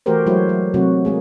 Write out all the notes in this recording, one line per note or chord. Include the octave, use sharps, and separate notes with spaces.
E3 A3 F#4 G4 A#4 C5
F#3 G#3 A3 E4 F#4 C5
F#3
C3 F#3 A3 F#4
G#3 A#3 G#4